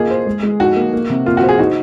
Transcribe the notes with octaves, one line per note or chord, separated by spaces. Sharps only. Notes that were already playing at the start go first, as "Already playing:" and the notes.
Already playing: A#3 F4 G#4 D#5
C5
G#3
G#3
D#4 F#4
A#3
A#3
C3
A#3 F4
F#4
C5
G#4
D#4 F#4